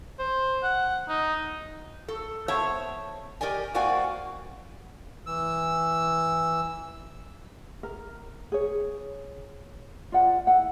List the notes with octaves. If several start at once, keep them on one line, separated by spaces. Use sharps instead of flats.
C5
F#5
D#4
A4
B3 C5 C#5 E5 A5
G4 A#4 D5 D#5 G#5
A#3 C4 F#4 D5 F#5 G#5
E3 E6
A#4
G#4 C#5
F4 D5 F#5
E4 F#5